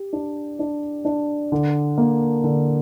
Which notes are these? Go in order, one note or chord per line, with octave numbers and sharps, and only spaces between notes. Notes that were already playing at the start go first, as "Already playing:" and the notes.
Already playing: G4
D4
D4
D4
D3
A#3
D3